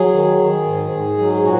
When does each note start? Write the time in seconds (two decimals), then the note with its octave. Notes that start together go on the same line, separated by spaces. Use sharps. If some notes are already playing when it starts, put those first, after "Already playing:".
Already playing: F#3 G#4
0.13 D#3
0.38 D#3
0.65 G#2
0.91 G#2
1.18 F#3
1.34 G#4
1.44 A#2 F#4